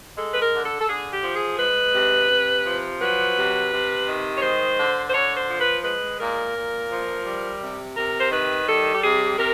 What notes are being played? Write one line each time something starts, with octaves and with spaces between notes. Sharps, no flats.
G#3 A4
B4
A#4
D3
A4
A4
D3 G#4
G4
F3
G#4
G#3 B4
C3
C3
F3
F#3 B4
C3
C3
D#3
C#5
G#3 C5
D3
C5
D3 C#5
C5
F3
B4
G#3 B4
A#2 A#4
A#2
F3
G3
C3
C3 A#4
C5
D#3 B4
G3 A4
G4
C3 G#4
C3 A#4